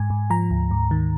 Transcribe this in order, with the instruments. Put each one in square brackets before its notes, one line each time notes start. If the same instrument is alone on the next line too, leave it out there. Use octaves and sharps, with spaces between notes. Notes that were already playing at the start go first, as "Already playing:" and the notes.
Already playing: [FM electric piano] G#2 G#5
G#2
F3 A#5
D2
G#2
D#3